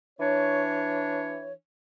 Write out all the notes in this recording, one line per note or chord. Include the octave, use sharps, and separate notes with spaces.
E3 D4 C#5